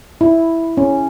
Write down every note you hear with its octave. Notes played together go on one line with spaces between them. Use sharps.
E4
C#4